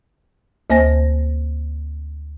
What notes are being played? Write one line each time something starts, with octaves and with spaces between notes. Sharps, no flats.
D2 A#3 C5 G#5 A#6